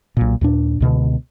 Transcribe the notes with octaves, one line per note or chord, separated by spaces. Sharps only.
B1 A#2
D#2 A#2 D4
C#2 B2 D3